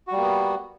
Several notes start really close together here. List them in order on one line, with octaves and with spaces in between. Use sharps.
F#4 G3 A#3 B3